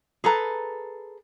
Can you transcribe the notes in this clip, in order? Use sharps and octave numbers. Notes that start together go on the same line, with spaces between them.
G#4 A4 B4 A#5